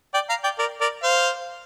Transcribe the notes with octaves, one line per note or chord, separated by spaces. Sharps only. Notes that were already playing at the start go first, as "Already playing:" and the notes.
D5 G5
F5 A#5
D5 G5
A#4 D5
A#4 D5
C5 F5